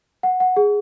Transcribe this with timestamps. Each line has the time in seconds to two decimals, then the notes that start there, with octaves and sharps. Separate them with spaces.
0.23 F#5
0.40 F#5
0.57 G#4